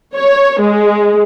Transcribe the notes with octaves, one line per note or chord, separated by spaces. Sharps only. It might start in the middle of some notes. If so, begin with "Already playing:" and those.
C#5
G#3